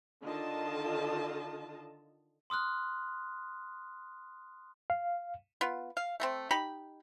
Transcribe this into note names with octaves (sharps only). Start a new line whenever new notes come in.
D3 D#3 F4 D#5 A5
C6 D#6 F6 F#6
F5
B3 F4
F5
A3 A#3 C4
D#4 G4 B5